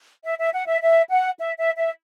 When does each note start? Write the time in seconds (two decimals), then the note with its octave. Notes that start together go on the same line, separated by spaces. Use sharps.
0.24 E5
0.38 E5
0.53 F#5
0.67 E5
0.81 E5
1.10 F#5
1.38 E5
1.58 E5
1.77 E5